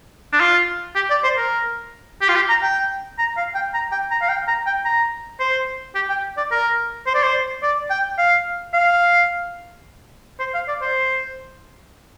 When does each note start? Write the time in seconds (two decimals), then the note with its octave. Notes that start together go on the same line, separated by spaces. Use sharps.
0.32 D4
0.40 F4
0.95 G4
1.10 D5
1.24 C5
1.37 A#4
2.21 G4
2.29 F4
2.35 G4
2.49 A#5
2.62 G5
3.18 A#5
3.37 F5
3.55 G5
3.74 A#5
3.92 G5
4.11 A#5
4.22 F5
4.29 G5
4.48 A#5
4.66 G5
4.85 A#5
5.40 C5
5.95 G4
6.10 G5
6.37 D5
6.51 A#4
7.06 C5
7.15 D5
7.23 C5
7.63 D5
7.90 G5
8.18 F5
8.74 F5
10.39 C5
10.54 F5
10.68 D5
10.81 C5